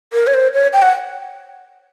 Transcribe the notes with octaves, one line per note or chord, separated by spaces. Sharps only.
A#4
C#5
C5
C#5
G5
F#5